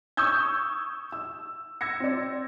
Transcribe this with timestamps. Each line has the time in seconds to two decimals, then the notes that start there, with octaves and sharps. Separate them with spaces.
0.17 C#6 D#6 E6 G6 G#6
1.12 E6
1.81 E6 G#6 A#6 C#7
2.00 C4 D5